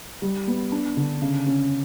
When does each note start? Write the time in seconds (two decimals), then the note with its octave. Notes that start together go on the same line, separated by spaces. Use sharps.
0.22 G3
0.47 B3
0.72 D4
0.97 D3
1.22 C#3
1.46 C#4